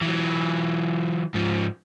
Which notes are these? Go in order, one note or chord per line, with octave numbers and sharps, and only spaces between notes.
E3 F#3
G#2 F3